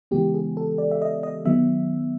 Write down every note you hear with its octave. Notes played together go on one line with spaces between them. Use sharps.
C#3 E3 G#3 B3 G4
G#4
A4
D5
E5
D#5
D#5
D#3 F#3 B3 E5